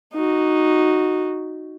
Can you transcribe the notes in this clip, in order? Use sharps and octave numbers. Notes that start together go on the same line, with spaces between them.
D#4 F#4